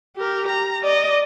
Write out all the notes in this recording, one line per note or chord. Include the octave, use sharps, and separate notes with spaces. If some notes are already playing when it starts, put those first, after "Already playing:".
G4 A#4
A#5
D5 D#5